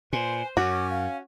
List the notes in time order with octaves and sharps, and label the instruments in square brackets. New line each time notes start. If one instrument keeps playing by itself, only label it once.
[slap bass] A#2 [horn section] B4 C5 [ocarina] G#5
[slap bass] F#2 [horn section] C#4 [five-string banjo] F#4 [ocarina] D6
[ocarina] F5